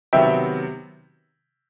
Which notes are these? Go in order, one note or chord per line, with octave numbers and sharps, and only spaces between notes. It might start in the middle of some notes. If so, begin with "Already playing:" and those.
C3 D#3 F#3 B3 E5 G5